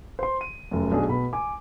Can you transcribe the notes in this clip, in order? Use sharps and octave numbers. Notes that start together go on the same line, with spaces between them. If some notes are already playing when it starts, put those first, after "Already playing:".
C5 C6
D#7
F1 F#2
B1 D4 G#4
B2 B5
G#5 D6